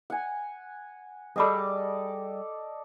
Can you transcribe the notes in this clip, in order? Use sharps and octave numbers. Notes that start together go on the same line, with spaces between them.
F#5 G#5
G3 G#4 A4 D5 D#5 B5